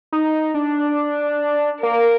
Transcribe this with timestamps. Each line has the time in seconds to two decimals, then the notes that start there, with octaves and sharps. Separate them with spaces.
0.12 D#4
0.54 D4
1.83 A#3 A#4